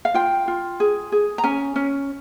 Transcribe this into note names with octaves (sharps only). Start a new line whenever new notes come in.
F5
F4 G5
F4
G#4
G#4
A#5
C#4 G#5
C#4